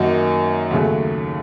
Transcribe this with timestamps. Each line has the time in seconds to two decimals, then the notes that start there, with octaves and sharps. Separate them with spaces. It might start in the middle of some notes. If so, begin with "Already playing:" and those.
Already playing: F#2 D#3 A#3 D#4 F#4
0.71 D#2 C#3 F#3 A3